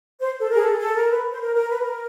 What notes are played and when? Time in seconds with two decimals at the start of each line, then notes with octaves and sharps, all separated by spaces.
0.20 C5
0.40 A4
0.50 G#4 A#4
0.60 A4
0.70 G#4
0.81 A4
0.96 A#4
1.11 B4
1.31 C5
1.41 A#4
1.55 A#4
1.69 B4
1.81 A#4